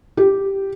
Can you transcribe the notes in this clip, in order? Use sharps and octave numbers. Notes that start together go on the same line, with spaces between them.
G4